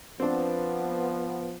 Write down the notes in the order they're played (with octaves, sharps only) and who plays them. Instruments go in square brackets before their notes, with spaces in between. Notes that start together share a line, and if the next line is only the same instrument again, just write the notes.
[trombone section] F3 B3 [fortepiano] C4 D4